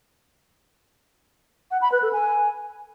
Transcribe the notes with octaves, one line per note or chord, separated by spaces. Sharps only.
F#5
B5
B4
A4
G#5